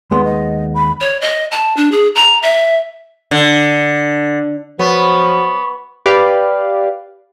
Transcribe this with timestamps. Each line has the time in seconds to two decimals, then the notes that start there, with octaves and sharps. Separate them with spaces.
0.11 D#2 G#3 B3 C6
0.25 D#5
0.75 B5
1.01 C#5
1.21 D#5
1.51 A5
1.77 D4
1.92 G#4
2.15 A#5
2.43 E5
3.31 D3
4.79 F3 F#3 B3 C#6
6.06 G4 B4 D5 F5